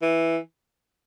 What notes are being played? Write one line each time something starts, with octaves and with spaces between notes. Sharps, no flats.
E3